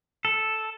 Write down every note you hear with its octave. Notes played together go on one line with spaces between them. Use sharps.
A4